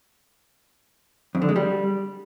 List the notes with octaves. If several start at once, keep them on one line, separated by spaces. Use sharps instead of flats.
F2
D3
G#3
G3